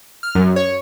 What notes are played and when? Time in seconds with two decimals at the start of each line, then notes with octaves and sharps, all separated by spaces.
0.23 F6
0.35 F#2
0.56 C#5